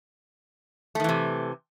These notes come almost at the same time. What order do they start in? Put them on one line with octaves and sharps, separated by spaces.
A3 D#3 E3 C3